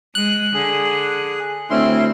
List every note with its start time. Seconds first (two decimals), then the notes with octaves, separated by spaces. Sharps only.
0.15 G#3 F#6
0.54 D3 G#4
1.70 D2 C4 C#4 E4 C6